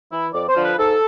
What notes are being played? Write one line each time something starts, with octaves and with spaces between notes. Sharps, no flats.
E3 E4
F2 D5
C5
D3 F3
B4
G#2 A4